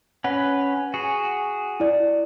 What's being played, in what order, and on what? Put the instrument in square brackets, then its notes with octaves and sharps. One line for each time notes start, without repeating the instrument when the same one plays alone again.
[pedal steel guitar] C#4 B4 [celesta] F#5
[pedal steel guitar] F#4 G#4
[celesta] E4 D5